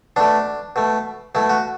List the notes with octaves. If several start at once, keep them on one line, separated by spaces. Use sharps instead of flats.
B2 A3 D4
B2 A3
B2 A3 E4
F#4